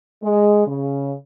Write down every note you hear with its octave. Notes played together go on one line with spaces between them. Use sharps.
G#3
C#3